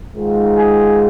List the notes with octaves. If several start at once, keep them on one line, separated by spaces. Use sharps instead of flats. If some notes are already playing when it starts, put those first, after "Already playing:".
G#2 D#3 G#3 F4
G#4